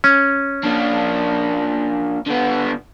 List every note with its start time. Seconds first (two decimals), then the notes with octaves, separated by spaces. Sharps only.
0.04 C#4
0.63 A#3 D4
2.27 D3 B3